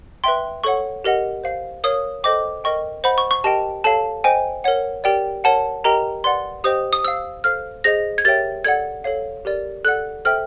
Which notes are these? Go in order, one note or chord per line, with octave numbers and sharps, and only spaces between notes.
B4 E5 G5 C6
A4 C#5 F#5 C#6
G4 A#4 D#5 F#5
C5 F5
A#4 C#5 F5 D#6
A4 C5 D#5 G5 D6
A#4 D#5 G5 C#6
C5 D#5 F#5 B5
C#6
C#6
G4 A#4 D#5 G5 A5
A4 C#5 F5 A5
C5 D#5 G5 G#5
A#4 C#5 F#5
G4 A#4 D5 G5
A#4 C#5 F#5 A5
G4 A#4 D#5 G5 A#5
B4 D5 F#5 C6
G4 C5 D#5 G5 D#6
D#6
C5 F5 E6
A4 C5 F5 F6
G#4 C5 D#5 A#6
G#6
G4 A#4 C#5 E5 G5 A6
A4 D5 F#5 G#6
A4 C#5 F5
G4 A#4 D5
A4 D5 F#5 F#6
A4 C5 E5 G5 F6